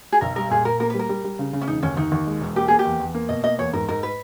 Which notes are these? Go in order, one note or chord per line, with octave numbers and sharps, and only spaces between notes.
G#4
B1 A#4
G3 A#4
A#2 G#4
A#2 A#4
A#3 A#4
B4
G3
A#4
G3
G3
C#3
C#3
C#4
E1 D#4
D#2 C#4
D#2 D#4
D#2
G#3
E1
A#3 G4
A#3 G#4
G4
E2
E2
A#3
B2 D#5
A#3 D#5
E2 C#5
G#2 A#4
G#2 A#4
B4